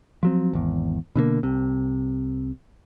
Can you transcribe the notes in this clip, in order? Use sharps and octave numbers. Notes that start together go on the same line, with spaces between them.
F3 F#3 C4
G#1 E2
B2 D3 E3 A#3
C2 C3